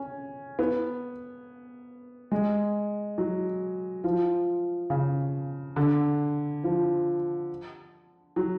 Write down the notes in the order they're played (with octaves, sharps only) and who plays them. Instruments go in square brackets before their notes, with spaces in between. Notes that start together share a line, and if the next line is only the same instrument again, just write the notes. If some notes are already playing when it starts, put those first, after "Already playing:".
Already playing: [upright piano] C#4
B3
G#3
F#3
F3
C#3
D3
F3
F#3